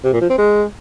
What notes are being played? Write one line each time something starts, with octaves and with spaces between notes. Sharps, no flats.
C3
A#2
F3
C4
G#3